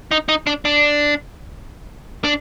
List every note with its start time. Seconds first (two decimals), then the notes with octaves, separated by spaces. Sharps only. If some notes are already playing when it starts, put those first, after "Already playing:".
0.11 D#4
0.29 D#4
0.47 D4
0.65 D4
2.24 D4